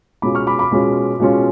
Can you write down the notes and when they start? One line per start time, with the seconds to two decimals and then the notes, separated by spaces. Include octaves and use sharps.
0.22 B2 G#3 C#4 F4 B5 D6
0.35 C#6 F6
0.47 B5 D6
0.59 B5 D6
0.71 B2 G#3 C#4 F4
1.20 B2 G#3 C#4 F4